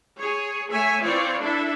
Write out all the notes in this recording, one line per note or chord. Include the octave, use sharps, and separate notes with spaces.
G#4 C#5
A3 C#5 E5 G#5
E3 C4 F4 C#5 D5
D4 E4 A4 E5